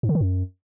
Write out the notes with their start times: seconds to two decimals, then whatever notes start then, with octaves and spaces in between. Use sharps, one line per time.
0.03 G#2
0.09 D3
0.15 D#3
0.21 F#2